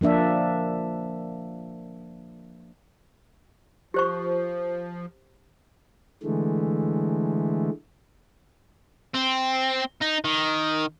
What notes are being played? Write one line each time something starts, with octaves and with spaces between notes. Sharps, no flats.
F3 A#3 D4 E5
F3 G4 C5 C#6
D3 E3 G#3 A3
C4
D#4
D#3